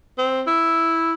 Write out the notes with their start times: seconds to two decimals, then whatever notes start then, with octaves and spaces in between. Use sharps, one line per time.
0.18 C4
0.47 E4